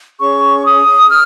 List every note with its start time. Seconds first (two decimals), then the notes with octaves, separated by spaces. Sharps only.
0.21 C#4 G#4 C#5 C#6
0.65 D#6
1.10 F6